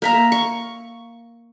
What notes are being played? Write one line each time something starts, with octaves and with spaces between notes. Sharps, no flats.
A#3 E5 A#5
C#6